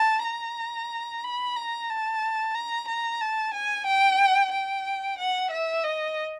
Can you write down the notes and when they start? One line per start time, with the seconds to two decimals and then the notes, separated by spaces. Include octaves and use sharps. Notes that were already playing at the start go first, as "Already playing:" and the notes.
Already playing: A5
0.25 A#5
1.24 B5
1.57 A#5
1.90 A5
2.55 A#5
2.88 A#5
3.21 A5
3.54 G#5
3.86 G5
4.53 G5
5.18 F#5
5.51 E5
5.84 D#5